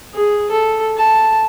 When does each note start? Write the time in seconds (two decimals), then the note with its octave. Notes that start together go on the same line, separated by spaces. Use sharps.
0.15 G#4
0.51 A4
0.97 A5